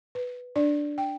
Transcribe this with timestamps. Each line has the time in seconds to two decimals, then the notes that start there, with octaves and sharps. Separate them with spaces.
0.15 B4
0.56 D4 D5
0.98 G5